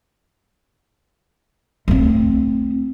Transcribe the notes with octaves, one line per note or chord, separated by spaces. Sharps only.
A3 C4